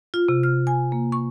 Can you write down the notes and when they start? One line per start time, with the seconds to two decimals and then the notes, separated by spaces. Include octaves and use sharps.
0.14 F4
0.29 C3
0.43 F6
0.67 G#5
0.92 A#3
1.12 C#6